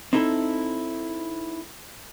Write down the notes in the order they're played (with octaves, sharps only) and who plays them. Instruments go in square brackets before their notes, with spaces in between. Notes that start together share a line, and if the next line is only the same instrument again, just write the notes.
[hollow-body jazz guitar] C4 D#4 E4 A4